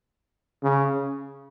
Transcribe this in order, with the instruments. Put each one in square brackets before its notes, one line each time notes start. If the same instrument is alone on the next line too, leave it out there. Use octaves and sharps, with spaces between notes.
[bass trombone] C#3